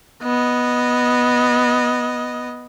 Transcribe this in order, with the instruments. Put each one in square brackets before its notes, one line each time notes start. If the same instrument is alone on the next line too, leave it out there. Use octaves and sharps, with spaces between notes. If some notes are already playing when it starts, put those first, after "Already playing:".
[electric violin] B3 D#5